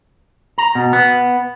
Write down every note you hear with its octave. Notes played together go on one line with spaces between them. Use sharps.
A#5
B2
B3